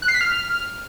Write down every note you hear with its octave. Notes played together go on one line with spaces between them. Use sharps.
F#6
C7
B6
F6